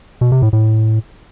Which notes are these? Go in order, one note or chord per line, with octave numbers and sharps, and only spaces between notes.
B2
C3
A2
A2